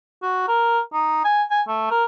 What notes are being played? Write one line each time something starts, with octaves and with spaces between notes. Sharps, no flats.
F#4
A#4
D#4
G#5
G#5
A3
A#4